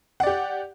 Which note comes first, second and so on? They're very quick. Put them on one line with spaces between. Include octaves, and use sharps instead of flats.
F#5 D5 G4